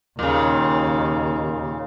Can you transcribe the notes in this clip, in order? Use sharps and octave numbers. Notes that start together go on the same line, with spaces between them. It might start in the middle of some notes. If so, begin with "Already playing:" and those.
D#2 A#2 C#3